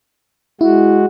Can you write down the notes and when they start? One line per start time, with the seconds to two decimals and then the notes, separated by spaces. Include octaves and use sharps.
0.61 G#3 E4 F#4